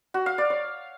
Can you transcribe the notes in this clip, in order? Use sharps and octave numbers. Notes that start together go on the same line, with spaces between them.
F#4
F5
D5
C#5